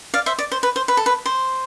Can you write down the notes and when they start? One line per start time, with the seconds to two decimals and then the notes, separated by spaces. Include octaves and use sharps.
0.14 D5 F5
0.26 C5 E5
0.39 D5
0.52 C5
0.63 B4
0.76 C5
0.88 B4
0.97 A4
1.06 B4
1.26 C5